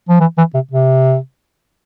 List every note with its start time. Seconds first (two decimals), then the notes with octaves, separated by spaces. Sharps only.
0.09 F3
0.20 E3
0.38 E3
0.54 C3
0.71 C3